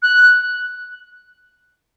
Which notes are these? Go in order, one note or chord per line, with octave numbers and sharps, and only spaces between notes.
F#6